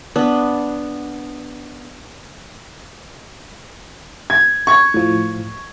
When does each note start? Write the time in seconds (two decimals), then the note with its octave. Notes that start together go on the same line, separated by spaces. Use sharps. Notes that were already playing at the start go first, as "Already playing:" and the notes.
0.16 B3 D4
4.30 G#6
4.67 C#6 G#6
4.94 A2 F3